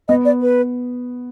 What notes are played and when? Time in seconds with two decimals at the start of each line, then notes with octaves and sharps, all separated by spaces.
0.08 B3 D#5
0.25 D5
0.42 B4